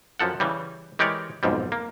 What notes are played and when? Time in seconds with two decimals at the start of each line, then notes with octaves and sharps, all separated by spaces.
0.19 F#2 F3 A4 F#5
0.40 C#3 E3 G3
0.99 E3 G#3 G4 A#4 C#5 D5
1.43 B1 F2 G#2 G3
1.72 A#3